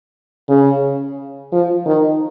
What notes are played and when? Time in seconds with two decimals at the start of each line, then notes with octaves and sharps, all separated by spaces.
0.49 C#3
1.52 F3
1.86 D#3